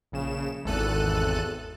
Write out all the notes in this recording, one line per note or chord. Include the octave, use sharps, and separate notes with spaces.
A#1 C#3 E7
G#1 E2 A4 F#6 D#7